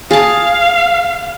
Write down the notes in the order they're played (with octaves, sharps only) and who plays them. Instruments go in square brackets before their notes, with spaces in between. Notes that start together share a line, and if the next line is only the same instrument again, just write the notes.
[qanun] G#4 A5 [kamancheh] F5